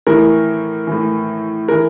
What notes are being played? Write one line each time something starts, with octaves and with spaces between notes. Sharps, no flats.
A2 E3 A#4
A2 E3
E3 A#4